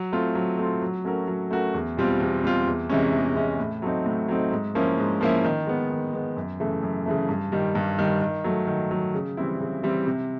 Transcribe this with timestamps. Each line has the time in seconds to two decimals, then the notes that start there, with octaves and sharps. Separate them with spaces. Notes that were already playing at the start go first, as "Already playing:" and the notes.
Already playing: F#3
0.13 A3 C4 F4
0.35 F#3
0.58 A3 C4 F4
0.82 F#3
1.05 A3 C#4 F#4 A#4
1.27 F#3
1.51 A3 C#4 F#4 A#4
1.74 E2
1.97 B2 G3 C4 F4
2.20 E2
2.43 B2 G3 C4 F4
2.67 E2
2.90 C3 E3 G#3 C#4
3.13 E2
3.36 C3 E3 G#3 C#4
3.59 A2
3.82 F#3 A3 C4 D#4
4.06 A2
4.28 F#3 A3 C4 D#4
4.51 G#2
4.75 F3 A#3 C#4 E4
4.98 G#2
5.21 F3 A#3 C#4 E4
5.44 D#3
5.67 G#3 B3
5.90 D#3
6.13 G#3 B3
6.37 F#2
6.60 C#3 E3 A3
6.83 F#2
7.06 C#3 E3 A3
7.29 G2
7.52 D#3 G3
7.75 G2
7.99 D#3 G3
8.21 D#3
8.44 F#3 A3
8.67 D#3
8.91 F#3 A3
9.14 C#3
9.37 E3 G3 C4 E4
9.60 C#3
9.83 E3 G3 C4 E4
10.07 C3